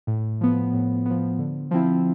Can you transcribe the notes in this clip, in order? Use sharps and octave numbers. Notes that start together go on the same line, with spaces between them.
A2
F3 B3
A2
F3 B3
D3
F3 C4 E4